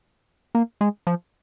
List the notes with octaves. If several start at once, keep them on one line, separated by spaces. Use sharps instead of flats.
A#3
G#3
F3